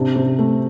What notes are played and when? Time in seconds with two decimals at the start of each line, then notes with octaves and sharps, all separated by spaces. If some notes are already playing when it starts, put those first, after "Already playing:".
Already playing: C3 D4
0.16 C3
0.39 A3